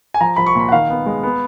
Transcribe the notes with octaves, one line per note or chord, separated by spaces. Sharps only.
G#5
F3 A#5
F3 B5
C#6
A#2 B5
F#5
D#3 F5
B3
G#3
B3